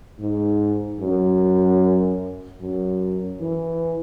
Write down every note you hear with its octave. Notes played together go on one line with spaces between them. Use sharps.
G#2
F#2
F#2
E3